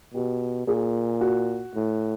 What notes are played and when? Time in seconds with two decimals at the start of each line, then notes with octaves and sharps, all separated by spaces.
0.14 B2 G4
0.68 A#2 G#4
1.21 F#4
1.75 A2